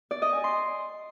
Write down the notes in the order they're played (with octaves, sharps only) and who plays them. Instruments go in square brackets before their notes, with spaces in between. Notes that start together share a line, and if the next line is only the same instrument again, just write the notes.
[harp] D5
D#5
G#5
C6